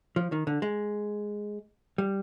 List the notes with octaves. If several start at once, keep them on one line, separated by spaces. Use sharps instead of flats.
F3
D#3
D3
G#3
G3